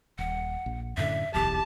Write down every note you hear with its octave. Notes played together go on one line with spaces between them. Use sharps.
D#1 F#5
A#1
F#2 A2 D3 E5
D1 B1 E2 G4 A5